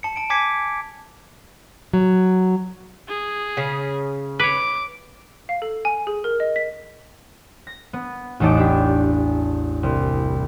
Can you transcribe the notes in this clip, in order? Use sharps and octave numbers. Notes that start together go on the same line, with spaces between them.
A5 C#7
A5 D7
G#5 A5 D6 G#6 B6 C#7
F#3
G#4
C#3
B4 C#5 D6
F5
A4
G#5
G#4
A#4
D#5
B6
A#6
B3
A1 E2 D#4 A5 D6
D4 G4
C2